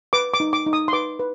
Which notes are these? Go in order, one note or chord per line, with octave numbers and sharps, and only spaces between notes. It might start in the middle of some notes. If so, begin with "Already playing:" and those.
B4 D6
D6
D#4
D6
D#4
D#6
C6
B4 D6
B4